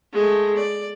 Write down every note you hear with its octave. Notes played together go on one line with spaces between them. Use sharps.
G#3 A3
D5